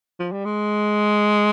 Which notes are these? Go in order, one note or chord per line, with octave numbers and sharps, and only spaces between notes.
F3
G3
G#3